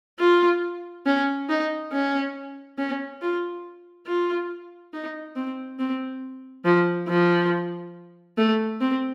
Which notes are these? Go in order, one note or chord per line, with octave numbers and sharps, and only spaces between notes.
F4
C#4
D#4
C#4
C#4
F4
F4
D#4
C4
C4
F3
F3
A3
C4